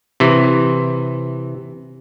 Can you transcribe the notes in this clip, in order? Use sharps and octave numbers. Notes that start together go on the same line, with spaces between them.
C3 E3